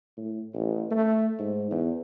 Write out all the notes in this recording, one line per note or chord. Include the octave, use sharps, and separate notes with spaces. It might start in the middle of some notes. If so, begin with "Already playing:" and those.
A2
A1
A3
G#2
E2